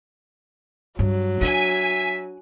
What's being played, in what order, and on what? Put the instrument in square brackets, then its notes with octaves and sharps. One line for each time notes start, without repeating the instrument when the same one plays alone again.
[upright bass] G2 [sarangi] F#3
[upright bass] D4 [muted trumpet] E5 [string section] G#5